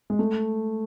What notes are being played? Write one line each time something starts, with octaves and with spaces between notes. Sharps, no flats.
G#3
A3